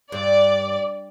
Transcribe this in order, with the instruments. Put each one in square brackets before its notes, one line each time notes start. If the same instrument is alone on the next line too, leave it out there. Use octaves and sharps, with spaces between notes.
[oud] G2 [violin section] D5